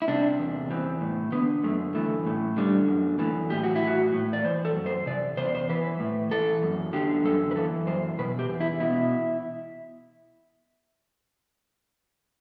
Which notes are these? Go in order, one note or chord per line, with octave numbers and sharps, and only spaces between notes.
E4
C3 D4
E2
E3 C4
A2
D3 B3
F#2 A3
E3 A3
A2
D3 G3
F#2
E3 A3
A2 G4
F#4
E4
E3 F#4
A2
D5
E3 C5
A4
F#2
C5
C3 D5
E2 C5
D5
C5
E3 B4
A2
E3 A4
F#2
D3 G4
F#2 A4
B4
E3 A4
F#2 C5
B2 B4
G4
E2
E4
B2 E4